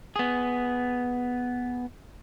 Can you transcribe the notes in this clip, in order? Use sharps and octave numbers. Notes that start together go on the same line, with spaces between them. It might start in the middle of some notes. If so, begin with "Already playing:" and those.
B3 G#4